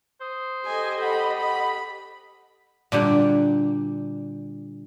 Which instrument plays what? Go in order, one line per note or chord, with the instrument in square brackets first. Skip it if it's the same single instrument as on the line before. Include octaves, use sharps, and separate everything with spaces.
[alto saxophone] C5 [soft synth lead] D#6
[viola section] G4 A4 D#5 [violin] G#5
[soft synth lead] F#5 [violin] B5
[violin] B5
[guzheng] A#2 D3 G3 D4 F#4